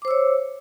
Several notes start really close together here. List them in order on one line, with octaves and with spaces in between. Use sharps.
D6 C5 E6 C#5